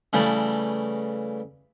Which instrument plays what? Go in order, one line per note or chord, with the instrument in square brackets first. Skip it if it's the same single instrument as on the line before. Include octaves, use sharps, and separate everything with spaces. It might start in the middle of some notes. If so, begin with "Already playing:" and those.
[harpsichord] C#3 E3 G3 A3 A5